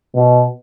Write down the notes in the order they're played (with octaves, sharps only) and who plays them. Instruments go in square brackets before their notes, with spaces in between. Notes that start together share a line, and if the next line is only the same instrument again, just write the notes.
[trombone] B2